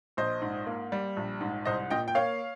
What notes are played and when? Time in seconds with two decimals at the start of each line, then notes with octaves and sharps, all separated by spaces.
0.17 A#1 C5 D#5
0.42 G#2
0.67 A#3
0.92 G3
1.17 A#1
1.41 G#2
1.65 C2 C5 D#5
1.90 A#2 D#5 G5
2.08 G5
2.15 A#3 C#5 F5